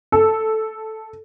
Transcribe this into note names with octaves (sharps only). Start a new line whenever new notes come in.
A4